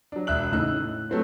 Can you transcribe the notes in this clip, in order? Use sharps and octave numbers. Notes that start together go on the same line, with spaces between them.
F#3 D4
E1 E5 F#6 F#7
A2 C#3 D#4 E6 F#6
A2
F#3 A3 C4 C#4